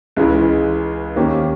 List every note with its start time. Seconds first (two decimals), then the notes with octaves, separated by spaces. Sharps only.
0.16 C#2 C#3 E3 G#3
1.16 D#2 D#3 A#3 C#4 G4